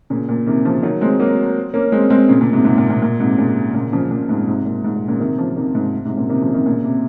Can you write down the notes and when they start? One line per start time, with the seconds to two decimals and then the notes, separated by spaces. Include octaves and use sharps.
0.10 A#2 C#3
0.29 A#2
0.47 C3 D#3
0.65 C#3 F3
0.83 D#3 F#3
1.01 G#3 C4
1.20 F#3 A#3
1.74 A#3 C#4
1.92 G#3 C4
2.10 G#3 C4
2.29 A#2 C#3
2.41 A#2 C#3
2.53 G#2 C3
2.65 G#2 C3
2.78 A#2
2.90 A#2
3.02 A#2
3.20 G#2 C3
3.38 A#2 C#3
3.74 A#2 C#3
3.93 C#3 F3
4.10 A#2 C#3
4.29 G#2 C3
4.47 G#2 C3
4.65 A#2
4.84 G#2
4.96 A#2
5.08 A#2 C#3
5.20 C3 D#3
5.38 C#3 F3
5.56 C3 D#3
5.75 G#2 C3
6.05 G#2 C3
6.17 A#2 C#3
6.29 C3 D#3
6.42 C#3 F3
6.53 C3 D#3
6.66 A#2 C#3
6.84 C3